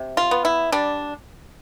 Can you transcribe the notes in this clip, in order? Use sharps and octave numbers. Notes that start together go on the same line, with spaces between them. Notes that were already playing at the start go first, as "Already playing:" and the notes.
Already playing: C3
F4
B3
E4
G3 D4